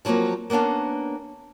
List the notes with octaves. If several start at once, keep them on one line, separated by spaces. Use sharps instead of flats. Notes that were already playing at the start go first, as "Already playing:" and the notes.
F3 F#3 G#3 A#3 C4
A#3 B3 C#4 D4 F5